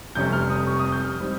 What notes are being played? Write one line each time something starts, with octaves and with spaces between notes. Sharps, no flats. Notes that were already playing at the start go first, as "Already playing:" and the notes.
F1 F2 C3 G3 C#4 G6
F6
D#6
C#6
D#6
G6
F6
G3 C4 D#4